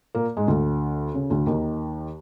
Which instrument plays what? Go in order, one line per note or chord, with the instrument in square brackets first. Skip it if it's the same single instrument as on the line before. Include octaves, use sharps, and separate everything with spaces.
[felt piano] A#2 A#3
G#2 G#3
D2 D3
C#3
D2 D3
D#2 D#3